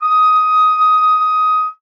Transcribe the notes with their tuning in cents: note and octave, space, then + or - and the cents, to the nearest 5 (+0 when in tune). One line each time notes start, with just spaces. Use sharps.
D#6 +15